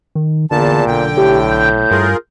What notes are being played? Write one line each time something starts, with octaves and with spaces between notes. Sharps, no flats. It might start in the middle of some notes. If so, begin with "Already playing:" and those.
D#3
E2 A#2 D3 A5
B1 D3 G5
A2 G4
G6
G2 F4 G#4 A#4